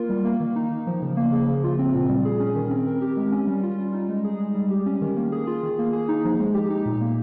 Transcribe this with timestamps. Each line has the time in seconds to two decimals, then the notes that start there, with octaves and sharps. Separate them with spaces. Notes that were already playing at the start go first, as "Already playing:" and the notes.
Already playing: A#3 F4 A#4
0.09 G3
0.25 A#3
0.40 D#3
0.56 D#4
0.71 D#3
0.87 F3
1.02 C#3
1.17 A#3
1.32 C#3
1.48 F3
1.64 F4
1.79 C4
1.94 A#2
2.09 G3
2.25 G#4
2.40 C#4
2.55 D#3
2.71 C4
2.86 A#4
3.01 G4
3.17 G#3
3.32 C#4
3.47 G3
3.63 F4
3.78 G3
3.94 D#4
4.09 G#3
4.25 G#4
4.40 G#3
4.55 G3
4.70 G4
4.86 C#4
5.01 D#3
5.16 A#3
5.32 G#4
5.47 F4
5.63 D#3
5.79 A#3
5.93 G#4
6.08 D#4
6.25 F3
6.40 G#3
6.54 G4
6.70 D#4
6.86 A#2
7.01 A#3